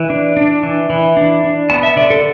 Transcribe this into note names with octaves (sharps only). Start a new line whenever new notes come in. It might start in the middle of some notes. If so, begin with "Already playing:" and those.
Already playing: E3
D4
D4
E3
E3
D4
D4
B3 A5
E5
D3 D5
A4